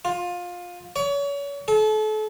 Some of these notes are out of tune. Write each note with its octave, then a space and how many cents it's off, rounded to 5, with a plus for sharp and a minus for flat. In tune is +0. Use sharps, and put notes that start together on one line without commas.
F4 +20
C#5 +35
A4 -35